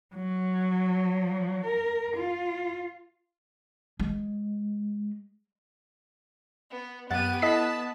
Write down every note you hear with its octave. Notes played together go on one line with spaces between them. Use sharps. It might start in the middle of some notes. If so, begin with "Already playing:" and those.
F#3
A#4
F4
G#3
B3
F#2 B3 G4 F#5 A6 D#7
E4 A4 D#5 A5 B5 B6